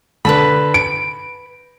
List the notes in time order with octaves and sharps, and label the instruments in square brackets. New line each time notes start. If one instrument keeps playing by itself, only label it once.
[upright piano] D3 [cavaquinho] B4 A5 B5
[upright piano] D7